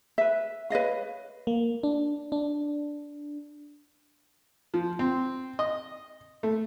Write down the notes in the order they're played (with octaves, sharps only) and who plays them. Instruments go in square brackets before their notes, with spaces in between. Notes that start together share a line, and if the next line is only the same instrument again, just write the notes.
[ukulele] B4 E5
B4 C#5 D#5 F5
[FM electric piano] A#3
D4
D4
[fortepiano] F3
C4
D#5
A3